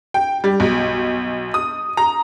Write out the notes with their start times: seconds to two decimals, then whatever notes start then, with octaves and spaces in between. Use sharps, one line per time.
0.14 G5
0.44 G3
0.60 B1
1.54 D#6
1.97 A#5